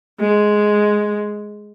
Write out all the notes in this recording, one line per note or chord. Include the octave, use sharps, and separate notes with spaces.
G#3